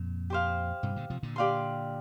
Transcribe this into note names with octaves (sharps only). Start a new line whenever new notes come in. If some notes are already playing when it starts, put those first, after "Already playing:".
Already playing: F2 A#2
G4 C5 F5
G2 C3
A#2 D3
C3 F3
A#2 D3
G4 D5 F5 C6